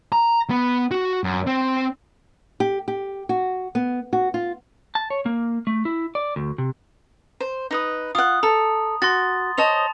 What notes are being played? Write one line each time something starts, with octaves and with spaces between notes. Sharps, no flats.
A#5
B3
F#4
F#2
C4
G4
G4
F#4
B3
F#4
F4
A5
C#5
A#3
A3
E4
D5
D2
C3
C5
D#4 B4 D#6
F4 F#5 D#6
A4 A#5
F#4 C6 A6
C5 C#5 D#5 A5 F7